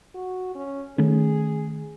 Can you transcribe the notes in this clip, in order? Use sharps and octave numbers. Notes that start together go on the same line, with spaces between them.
F#4
C#4
D#3 A3 C#4 G#4